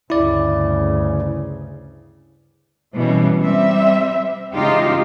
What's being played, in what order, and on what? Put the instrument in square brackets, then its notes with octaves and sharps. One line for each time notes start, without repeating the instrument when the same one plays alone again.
[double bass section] D2 G2 C#3 [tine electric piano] E4 D5
[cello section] B2 E3 G3 C#4
G3 C4 E5
E2 C#3 G#3 D#4 F4 G4